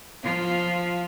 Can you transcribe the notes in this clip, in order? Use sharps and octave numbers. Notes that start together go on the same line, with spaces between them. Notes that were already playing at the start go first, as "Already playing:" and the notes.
F3 F4